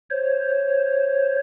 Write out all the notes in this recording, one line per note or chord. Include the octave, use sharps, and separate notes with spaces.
C5 C#5